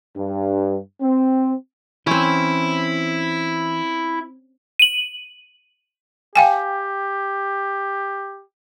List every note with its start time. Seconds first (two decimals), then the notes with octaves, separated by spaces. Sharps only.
0.17 G2
1.02 C4
2.07 E3 C4 C#4 E4
4.79 D#7 F#7
6.36 G4 F5 G5 G#5